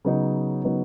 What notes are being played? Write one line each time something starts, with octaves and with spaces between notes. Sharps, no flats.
C#3 F#3 B3 D#4
C#3 F#3 B3 D#4